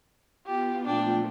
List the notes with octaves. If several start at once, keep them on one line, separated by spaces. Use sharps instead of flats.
B3 F4 G4
A#2 F3 A3 D4 G5